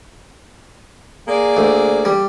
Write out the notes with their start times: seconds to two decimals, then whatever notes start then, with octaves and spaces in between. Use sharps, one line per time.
1.28 A#3 G#4 D5
1.57 D2
2.05 G3